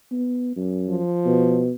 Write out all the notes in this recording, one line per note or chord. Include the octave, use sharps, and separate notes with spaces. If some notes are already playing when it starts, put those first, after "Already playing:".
B3
F#2
F3
B2